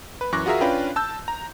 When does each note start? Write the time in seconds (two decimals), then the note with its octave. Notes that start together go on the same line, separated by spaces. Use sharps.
0.21 B4
0.32 F#2 E3 C#6 D6 F#6 A#6
0.46 F4 F#4 G#4 A#4 E5 A#5
0.61 C#4 D4 F4 B4 G5
0.96 A5 E6 G6
1.28 A#5